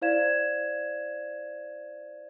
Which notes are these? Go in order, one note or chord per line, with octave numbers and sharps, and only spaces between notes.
E4 C5 D5 F5 G#6 E7